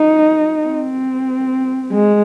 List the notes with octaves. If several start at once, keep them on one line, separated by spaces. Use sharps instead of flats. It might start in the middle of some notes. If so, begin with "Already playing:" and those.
Already playing: D#4
C4
G#3